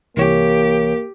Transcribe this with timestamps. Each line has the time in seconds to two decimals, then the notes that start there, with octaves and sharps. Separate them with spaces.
0.17 C2 E3 A#3 G4 C#5